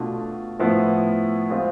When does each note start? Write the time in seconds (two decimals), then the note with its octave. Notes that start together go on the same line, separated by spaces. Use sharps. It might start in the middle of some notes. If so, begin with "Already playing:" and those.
Already playing: B2 A3 D4 F4
0.59 A2 F3 B3 E4
1.49 G#3 C4 F4